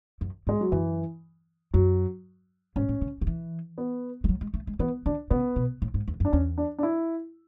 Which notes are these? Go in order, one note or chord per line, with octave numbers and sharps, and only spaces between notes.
F#2
G#2 G#3
F#3
F#2 E3
F#2 F#3
G#2 C#4
A2
C#3
D3
E3
B3
G#3
F#3
G#3
A3
G#3
E3 B3
D3 D4
C#3 B3
B2
A2
G#2
E2
F#2
D4
E2 C#4
D4
D4
E4